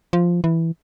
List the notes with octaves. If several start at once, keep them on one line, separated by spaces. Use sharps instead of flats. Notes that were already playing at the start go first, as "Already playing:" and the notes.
F3
E3